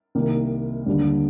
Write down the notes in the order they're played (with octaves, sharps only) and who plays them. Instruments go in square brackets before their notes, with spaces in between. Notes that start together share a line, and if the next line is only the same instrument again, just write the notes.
[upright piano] C2 C3 D#3 A#3
D#2 D3 G3 D4